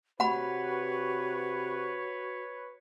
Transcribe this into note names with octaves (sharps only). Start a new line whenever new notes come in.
C3 F#4 B4 C#5 F#5 B5